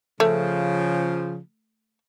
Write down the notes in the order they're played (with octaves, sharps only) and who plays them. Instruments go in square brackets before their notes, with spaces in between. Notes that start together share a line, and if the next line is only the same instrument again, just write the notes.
[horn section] C#3 F3 [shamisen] A3